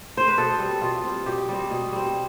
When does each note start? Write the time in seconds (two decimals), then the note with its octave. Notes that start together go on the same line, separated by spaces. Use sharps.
0.17 C5
0.28 B4
0.37 B2 A4
0.59 G3 C4
0.82 B2 F4
1.04 G3 C4
1.26 B2 G4
1.49 G3 C4
1.70 B2
1.92 G3 C4